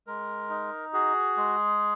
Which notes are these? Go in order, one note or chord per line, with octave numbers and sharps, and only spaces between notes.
G#3 A#4
D#4
F#4 G#4
G#3